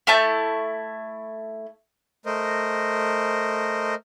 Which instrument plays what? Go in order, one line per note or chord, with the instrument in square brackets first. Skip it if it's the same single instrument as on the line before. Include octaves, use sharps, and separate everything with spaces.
[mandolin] A3 E4 A5 G6
[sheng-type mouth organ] A3 A#4 C5 D#5